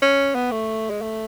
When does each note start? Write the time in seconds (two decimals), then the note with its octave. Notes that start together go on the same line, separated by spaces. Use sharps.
0.02 C#4
0.35 B3
0.52 A3
0.90 G#3
1.02 A3